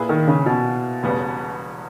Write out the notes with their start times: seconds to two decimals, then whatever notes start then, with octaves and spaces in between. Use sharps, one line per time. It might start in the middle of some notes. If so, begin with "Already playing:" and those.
Already playing: A#2 A#3 E4 G#4 B4
0.09 D#3
0.28 C#3
0.46 B2
1.03 E1 E2 C#3 G3 B3